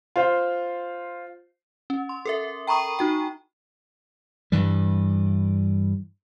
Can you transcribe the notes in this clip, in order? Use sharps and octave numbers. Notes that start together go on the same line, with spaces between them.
F4 C5 F5
C#4
C6
A4 A#4 E5
G5 A#5 B5 C#6 D#6 D#7
D#4 F#4 G5
G2 E3 G3